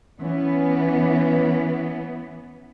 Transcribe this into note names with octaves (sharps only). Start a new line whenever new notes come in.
E3 B3 C#4